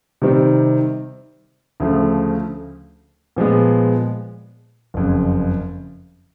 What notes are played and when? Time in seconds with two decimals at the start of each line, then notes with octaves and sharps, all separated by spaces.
0.22 C3 D#3 G3 C4
1.80 D2 C#3 F3 A3
3.36 A#2 F3 G#3 B3
4.94 F#1 F2 C#3